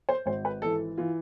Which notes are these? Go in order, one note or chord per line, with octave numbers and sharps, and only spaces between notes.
C5
G#1 C5
B4
E3 A4
E3 F4